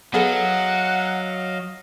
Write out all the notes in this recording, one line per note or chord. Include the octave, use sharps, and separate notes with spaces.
F#3 B3 G#4 A4 D#5 F5 F#5